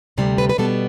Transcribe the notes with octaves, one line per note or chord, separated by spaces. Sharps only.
D2 C3 G3
B4
B4
B2 G3 B3 A4